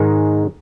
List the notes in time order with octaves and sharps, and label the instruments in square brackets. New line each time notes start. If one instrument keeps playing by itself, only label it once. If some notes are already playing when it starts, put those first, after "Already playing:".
Already playing: [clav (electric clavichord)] G#2 D#3 G#3 D#4